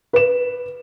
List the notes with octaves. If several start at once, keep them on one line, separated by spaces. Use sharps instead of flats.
B4 E7